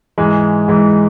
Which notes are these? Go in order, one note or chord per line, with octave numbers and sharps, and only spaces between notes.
G#2 E3 G#3
G#2 E3 G#3